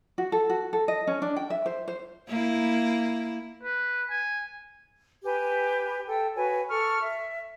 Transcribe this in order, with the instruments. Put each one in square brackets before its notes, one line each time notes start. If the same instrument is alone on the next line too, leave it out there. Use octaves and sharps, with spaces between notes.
[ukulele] F#4
A4
F#4
A4
D#5
C#4
D4
G5
E5
C5
C5
[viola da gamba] A#3 E4
[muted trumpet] B4
G#5
[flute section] G4 B4 G#5
A4 G5
F#4 B4 C#5 G#5
A4 C#6 F6
E5